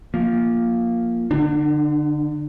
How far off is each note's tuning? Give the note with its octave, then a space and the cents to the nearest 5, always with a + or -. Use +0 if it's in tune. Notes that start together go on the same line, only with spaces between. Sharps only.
F3 +0 A#3 +0
D3 +0 D4 +45